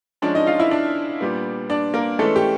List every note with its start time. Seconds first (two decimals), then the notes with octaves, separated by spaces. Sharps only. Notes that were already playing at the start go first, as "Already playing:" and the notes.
0.22 F3 G#3 C#4 D4 D5
0.35 D#4 D#5
0.46 F4 F5
0.60 E4 E5
0.71 D4 D5
1.21 A#2 G3 B3
1.70 D4 D5
1.94 A#3 A#4
2.19 E3 G#3 A3 C#4 A4
2.36 G4